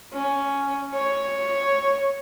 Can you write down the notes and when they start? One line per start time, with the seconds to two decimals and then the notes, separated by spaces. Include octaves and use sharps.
0.14 C#4
0.94 C#5